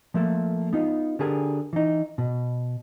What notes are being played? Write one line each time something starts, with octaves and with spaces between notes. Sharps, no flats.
F3 A3 A#3 A4
B3 D#4 F4
D3 G4 G#4 A#4 G#5
E3 D#4
B2